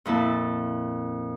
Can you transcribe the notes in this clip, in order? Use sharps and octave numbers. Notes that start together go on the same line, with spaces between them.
F2 A#2 E4 A5